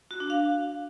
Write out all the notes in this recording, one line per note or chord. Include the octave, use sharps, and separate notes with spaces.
F#4
D4
F5